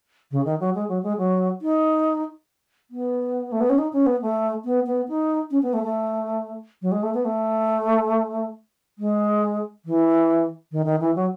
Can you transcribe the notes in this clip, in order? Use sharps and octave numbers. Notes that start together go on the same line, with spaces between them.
C#3
D#3
F#3
G#3
F#3
G#3
F#3
D#4
B3
A3
B3
C#4
D#4
C#4
B3
A3
B3
B3
D#4
C#4
B3
A3
A3
F#3
G#3
A3
B3
A3
G#3
E3
D#3
D#3
E3
F#3